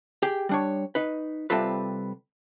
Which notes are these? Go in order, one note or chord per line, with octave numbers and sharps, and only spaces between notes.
G4 G#4 G5
G3 D4 C#5
D#4 B4
C3 G3 C4 F4 A4 B4